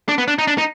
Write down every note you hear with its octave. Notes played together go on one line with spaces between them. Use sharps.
D4
B3
D4
D#4
D4
D#4